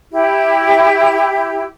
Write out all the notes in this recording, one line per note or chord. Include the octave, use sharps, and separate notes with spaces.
E4 G4